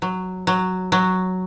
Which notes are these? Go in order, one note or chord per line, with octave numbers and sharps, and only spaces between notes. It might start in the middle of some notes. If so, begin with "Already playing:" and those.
F#3
F#3
F#3